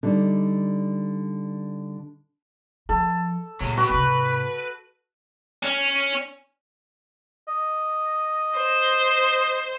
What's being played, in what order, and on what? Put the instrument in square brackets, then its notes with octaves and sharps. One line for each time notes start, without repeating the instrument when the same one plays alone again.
[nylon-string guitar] D3 G3 D#4
[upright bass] F3 [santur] A4
[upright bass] A#2 [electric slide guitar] F#3 G#3
[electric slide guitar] B3 G4 [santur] F#4
[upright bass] G#2 C3 [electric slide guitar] B4
[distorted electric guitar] C#4
[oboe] D#5
[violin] C5